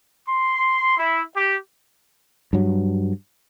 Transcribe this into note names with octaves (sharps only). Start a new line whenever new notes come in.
C6
E4
G4
G2 F#3